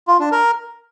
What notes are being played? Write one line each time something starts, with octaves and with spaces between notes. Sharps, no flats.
F4
D4
A#4